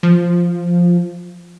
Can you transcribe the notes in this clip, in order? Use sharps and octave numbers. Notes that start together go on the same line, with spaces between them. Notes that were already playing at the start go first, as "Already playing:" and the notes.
F3